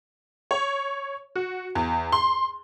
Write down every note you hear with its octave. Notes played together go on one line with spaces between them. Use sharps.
C#5
F#4
E2
C6